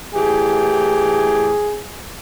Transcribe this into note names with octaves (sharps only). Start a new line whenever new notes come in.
A2 E3 G4 G#4